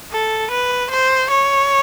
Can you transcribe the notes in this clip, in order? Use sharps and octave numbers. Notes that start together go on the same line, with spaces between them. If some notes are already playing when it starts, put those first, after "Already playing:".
A4
B4
C5
C#5